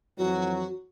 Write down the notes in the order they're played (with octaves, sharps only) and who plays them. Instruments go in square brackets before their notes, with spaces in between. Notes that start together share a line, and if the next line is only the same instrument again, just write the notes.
[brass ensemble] F2 E3 F#3 [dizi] F#4